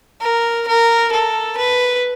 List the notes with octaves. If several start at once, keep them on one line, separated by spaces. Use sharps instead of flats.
A#4
A#4
A4
B4